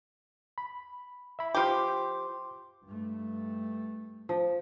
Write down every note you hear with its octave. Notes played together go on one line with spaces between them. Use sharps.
B5
E5 B5
F3 G4 C6 D6
G2 A3
F3